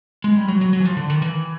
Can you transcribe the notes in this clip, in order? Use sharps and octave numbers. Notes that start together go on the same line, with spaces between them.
G#3
G3
F#3
F#3
F#3
E3
F3
D3
D#3
E3